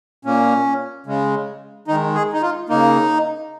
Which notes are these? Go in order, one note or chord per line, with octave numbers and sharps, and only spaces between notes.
A#2 A#3 C#4
C#3 G#3
D#3 G#3 D#4
G#4
D#4
F4
C#3 A#3 D#4